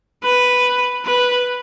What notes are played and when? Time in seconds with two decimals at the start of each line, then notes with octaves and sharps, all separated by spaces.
0.23 B4
1.05 B4